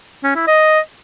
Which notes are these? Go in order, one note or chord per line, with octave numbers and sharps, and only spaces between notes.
C#4
E4
D#5